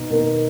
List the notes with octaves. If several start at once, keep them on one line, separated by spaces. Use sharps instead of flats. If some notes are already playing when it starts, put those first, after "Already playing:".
Already playing: B2 D#4
B2 A#3 D#4 A#4